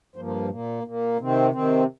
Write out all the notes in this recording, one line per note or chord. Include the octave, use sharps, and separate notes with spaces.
G2 F3 A#3 C5
C5
A#2 A#3
A#2 A#3
C3 D#3 C4
C3 D#3 C4